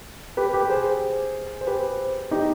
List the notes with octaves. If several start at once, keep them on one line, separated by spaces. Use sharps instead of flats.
G4 B4
G4 B4
G#4 C5
C5
G4 B4
D#4 G4